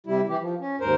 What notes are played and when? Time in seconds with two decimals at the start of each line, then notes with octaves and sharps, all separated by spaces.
0.07 C3 G3 E4
0.29 E3 G4
0.41 F3
0.60 C#4
0.81 D#2 G#2 A#4 C5